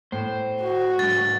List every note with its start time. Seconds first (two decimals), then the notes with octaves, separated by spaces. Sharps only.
0.12 A2 C5
0.61 F#4
0.99 G#2 F#3 A6